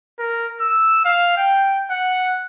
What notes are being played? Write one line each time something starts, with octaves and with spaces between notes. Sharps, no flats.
A#4
E6
F5
G5
F#5